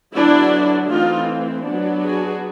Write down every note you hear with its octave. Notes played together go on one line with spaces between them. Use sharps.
D3 F#3 B3 D4 E4
E3 A3 C4 D#4 F4
F#3 B3 D4
F#4 G#4